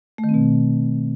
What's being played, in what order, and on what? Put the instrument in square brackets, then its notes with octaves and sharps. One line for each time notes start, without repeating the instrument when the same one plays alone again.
[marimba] A3
D#3
C4
B2